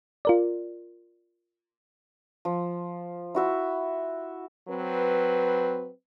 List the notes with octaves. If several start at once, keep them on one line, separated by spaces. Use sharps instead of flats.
F4 A#4 D5
F3
E4 F#4 E5
F#3 C4 B4